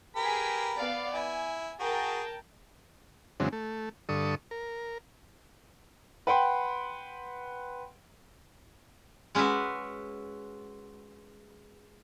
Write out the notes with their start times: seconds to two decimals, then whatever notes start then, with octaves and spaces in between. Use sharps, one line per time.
0.16 G4 G#4 A#4 B4 B6
0.77 B3 D5 F5
1.14 E4 G#5
1.80 F#4 G#4 A#4 G5 A5
3.40 E2 C#3 F#3 G#3 C4 D4
3.52 A3
4.09 G2 D3 A4 C#6 D#6
4.51 A#4
6.27 B4 F#5 G5 C6
9.35 G#3 C#4 F#4 B4 E5